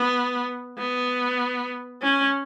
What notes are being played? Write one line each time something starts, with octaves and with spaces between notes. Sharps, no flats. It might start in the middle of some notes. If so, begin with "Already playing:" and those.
Already playing: B3
B3
C#4